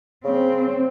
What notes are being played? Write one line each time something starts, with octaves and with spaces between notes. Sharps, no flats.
C#3 C4